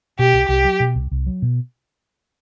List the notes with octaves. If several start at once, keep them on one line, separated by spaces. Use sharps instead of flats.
B2 G4
C2
C2 G4
F#3
B2
C2
C2
F#3
B2